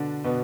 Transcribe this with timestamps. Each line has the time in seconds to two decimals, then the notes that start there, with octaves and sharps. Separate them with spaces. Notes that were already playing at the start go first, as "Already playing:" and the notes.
Already playing: B2 D3 D4
0.24 B2 B3